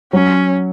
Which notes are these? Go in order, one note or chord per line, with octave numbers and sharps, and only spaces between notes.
F#3 C#4